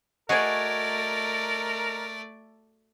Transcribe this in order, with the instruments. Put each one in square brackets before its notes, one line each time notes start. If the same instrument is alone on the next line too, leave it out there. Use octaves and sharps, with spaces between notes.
[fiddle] A3 D5 [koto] F#4 G#4 [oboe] A#4 [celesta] D#5 G#6